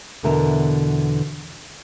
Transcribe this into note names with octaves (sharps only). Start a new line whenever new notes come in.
E2 B2 D3 B3 A#4 E5